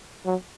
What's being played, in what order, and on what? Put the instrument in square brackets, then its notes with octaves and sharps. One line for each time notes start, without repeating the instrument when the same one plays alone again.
[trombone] F#3